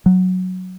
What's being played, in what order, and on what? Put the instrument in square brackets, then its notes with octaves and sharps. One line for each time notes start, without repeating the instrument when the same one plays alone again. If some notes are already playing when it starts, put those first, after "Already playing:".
[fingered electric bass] F#3